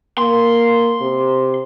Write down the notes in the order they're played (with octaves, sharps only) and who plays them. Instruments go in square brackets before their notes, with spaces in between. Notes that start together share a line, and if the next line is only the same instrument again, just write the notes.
[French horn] A#3 [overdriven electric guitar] C6
[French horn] C3